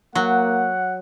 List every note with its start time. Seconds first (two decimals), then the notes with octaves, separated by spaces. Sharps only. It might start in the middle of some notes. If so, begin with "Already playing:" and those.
0.15 F#3 A#3 F#5